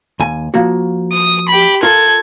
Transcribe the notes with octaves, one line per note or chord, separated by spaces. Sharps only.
D#2 G#5
F3 A#3 F#4
D#6
G4 B5
F4 A4 A#4 G#6